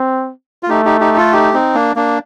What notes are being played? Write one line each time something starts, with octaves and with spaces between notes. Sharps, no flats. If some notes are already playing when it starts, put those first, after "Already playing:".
Already playing: C4
F4
A3 D#4 G4
D#4 G4
D#4 G4
F4 A4
D#4 G4
C4 D#4
A#3 D4
A#3 D4